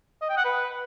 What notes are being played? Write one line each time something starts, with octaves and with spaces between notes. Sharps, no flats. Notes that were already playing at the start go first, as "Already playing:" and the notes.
D#5
G5
F#5
B4